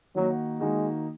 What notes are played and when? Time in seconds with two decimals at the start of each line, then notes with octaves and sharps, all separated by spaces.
0.15 D#3 F#3 A#3 D#4 F#4
0.60 D#3 G#3 A#3 D#4 F#4